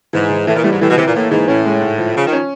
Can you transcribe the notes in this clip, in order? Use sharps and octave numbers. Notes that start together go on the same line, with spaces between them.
G#2 E3
E3
A2 E3
A#2
A2 G3
G#2
A2 E3
B2
C3 E3
A#2
A2 A#3
G#2 E3
A2 C#4
G#3
G#2
F3
C#3 F3
D#3
C#4